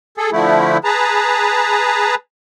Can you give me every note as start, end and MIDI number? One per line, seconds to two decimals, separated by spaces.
0.17 0.30 68
0.17 0.30 69
0.32 0.78 50
0.32 0.78 53
0.32 0.78 57
0.32 0.78 64
0.84 2.15 68
0.84 2.15 71
0.84 2.15 81
0.84 2.15 82